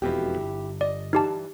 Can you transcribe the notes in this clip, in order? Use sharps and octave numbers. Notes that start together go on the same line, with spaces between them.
E1 F2 B2 E4 G4
G1
D5 D#5
G2 E3 D#4 G4 A5